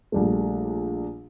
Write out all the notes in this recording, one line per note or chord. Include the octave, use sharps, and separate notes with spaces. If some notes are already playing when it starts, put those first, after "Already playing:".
A#1 G3 A3